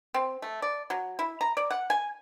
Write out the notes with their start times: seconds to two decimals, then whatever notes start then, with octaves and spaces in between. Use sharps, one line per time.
0.14 C4
0.42 A3
0.62 D5
0.90 F#3
1.19 E4
1.41 A#5
1.57 D5
1.71 F#5
1.90 G#5